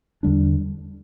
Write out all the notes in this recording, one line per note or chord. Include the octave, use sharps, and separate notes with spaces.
E2 D3 G3 D4